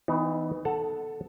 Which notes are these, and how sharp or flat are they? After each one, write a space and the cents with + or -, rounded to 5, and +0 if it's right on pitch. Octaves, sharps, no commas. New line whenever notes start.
E3 -25 B3 +25 D#4 +0
A4 +0 F#5 +0 A5 +25